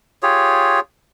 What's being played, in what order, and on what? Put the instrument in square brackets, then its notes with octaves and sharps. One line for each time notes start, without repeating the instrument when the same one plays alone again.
[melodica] F4 G4 G#4 C#5